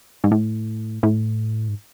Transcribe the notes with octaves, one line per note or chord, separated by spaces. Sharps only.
G#2
A2
A2
G#2